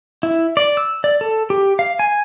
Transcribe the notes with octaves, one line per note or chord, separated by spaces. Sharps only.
E4
D5
E6
D5
A4
G4
F5
G#5